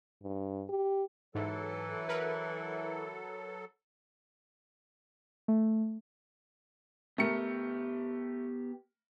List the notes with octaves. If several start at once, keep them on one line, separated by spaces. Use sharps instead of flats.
G2
G4
G#2 E3 F#3 A4
A#4 B4
A3
A3 B3 G4 A#4 C#7